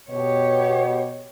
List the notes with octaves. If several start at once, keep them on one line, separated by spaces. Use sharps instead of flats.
B2 G4 C#5